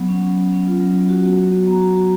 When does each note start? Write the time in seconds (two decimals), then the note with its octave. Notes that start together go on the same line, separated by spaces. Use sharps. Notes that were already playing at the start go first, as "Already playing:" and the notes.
Already playing: F#3 B3
0.09 C#4
0.23 C#4
0.37 C#4
0.52 C#4
0.67 F4
0.81 F#3
0.95 F#3
1.09 F#4
1.24 B3
1.38 F#4
1.53 B3
1.67 B3 A#5
1.81 F#4
1.97 F#4